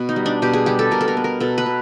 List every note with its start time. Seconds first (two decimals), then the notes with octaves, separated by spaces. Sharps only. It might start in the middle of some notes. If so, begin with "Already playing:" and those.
Already playing: B2 B3
0.09 D#4
0.16 G3
0.26 D4
0.42 B2 G4
0.53 G#4
0.66 G3 G4
0.79 A4
0.91 B2 A#4
1.01 A4
1.08 A#4
1.17 B3
1.24 A#4
1.40 B2 A4
1.58 B4
1.66 B2